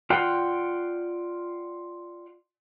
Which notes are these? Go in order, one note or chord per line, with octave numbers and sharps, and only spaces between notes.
F4 D5 F#5 G5